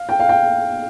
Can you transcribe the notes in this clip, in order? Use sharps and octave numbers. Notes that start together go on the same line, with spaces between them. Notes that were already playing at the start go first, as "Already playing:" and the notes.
Already playing: F5
G5
F5
G5